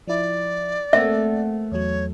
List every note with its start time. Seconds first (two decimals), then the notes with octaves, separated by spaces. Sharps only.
0.08 F3 E4 D5
0.93 A3 A#3 C4 E5 F#5
1.72 E2 F#3 C#5